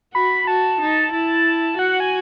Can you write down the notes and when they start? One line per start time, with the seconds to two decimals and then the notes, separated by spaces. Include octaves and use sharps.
0.14 F#4 B5
0.47 F#4 A5
0.80 D#4 A5
1.13 E4 A5
1.78 F#4 F#5
1.89 F#5
2.00 G#5